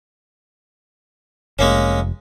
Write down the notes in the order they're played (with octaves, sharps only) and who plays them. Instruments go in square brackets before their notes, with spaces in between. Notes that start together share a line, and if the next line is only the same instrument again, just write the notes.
[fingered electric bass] F1 [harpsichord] G#3 A#3 C#4